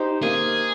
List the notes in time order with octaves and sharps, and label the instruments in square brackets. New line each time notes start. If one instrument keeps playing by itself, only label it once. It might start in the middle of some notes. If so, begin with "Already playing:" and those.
Already playing: [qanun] D#4 G4 C5
[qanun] A#3 [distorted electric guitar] G#4